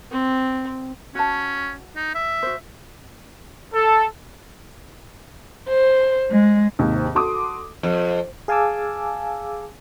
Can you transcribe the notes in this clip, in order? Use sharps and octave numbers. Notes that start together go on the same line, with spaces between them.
C4
C#4 F#4 A5
D#4
E5
F#4 C5
A4
C5
G#3
D#2 G#2 C3
F#4 A4 C6 D6 D#6
F2
G#4 F5 G#5 A5 D6 E6